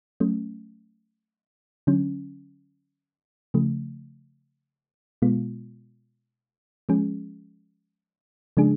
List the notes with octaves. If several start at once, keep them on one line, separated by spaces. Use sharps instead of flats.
F#3 A3 C#4
D3 F#3 C#4
C#3 F3 A3
B2 G#3 B3 F4
F3 G#3 C#4 G#4
C#3 F3 G#3 D4 G#4